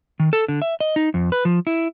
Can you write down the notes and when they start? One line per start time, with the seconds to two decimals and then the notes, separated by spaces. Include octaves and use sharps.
0.20 D#3
0.33 A4
0.48 D3
0.62 E5
0.80 D#5
0.96 D#4
1.14 F2
1.32 B4
1.45 F3
1.67 E4